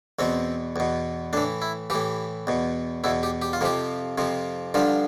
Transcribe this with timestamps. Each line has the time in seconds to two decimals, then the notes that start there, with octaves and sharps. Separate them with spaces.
0.19 E2 B2 C4
0.76 E2 B2
1.33 A2 E3 D4
1.62 E4
1.90 A2 E3 G4
2.47 E2 B2
3.04 E2 B2 E4
3.23 G4
3.42 G4
3.53 F4
3.61 F2 C3 F3 G4
4.18 F2 C3 F3
4.74 G2 D3 F3 F4